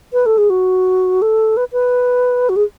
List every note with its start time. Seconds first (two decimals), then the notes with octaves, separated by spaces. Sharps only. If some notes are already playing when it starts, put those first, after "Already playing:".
0.13 B4
0.26 A4
0.38 G#4
0.50 F#4
1.22 A4
1.57 B4
1.72 B4
2.49 F#4
2.56 G#4